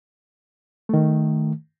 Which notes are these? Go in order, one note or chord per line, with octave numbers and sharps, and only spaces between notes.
D#3 A3